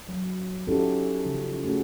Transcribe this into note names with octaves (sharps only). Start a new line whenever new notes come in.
F#3
C#4 D#4 E4 F#4 G4 A4
C#3 F3
A3 C#4 F#4 G#4